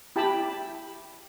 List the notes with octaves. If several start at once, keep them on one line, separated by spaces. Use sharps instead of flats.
E4 G4 G5 A5 B5